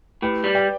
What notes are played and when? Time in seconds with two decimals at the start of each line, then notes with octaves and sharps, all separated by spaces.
0.22 A2 G4 B4
0.44 G3
0.55 D5 G5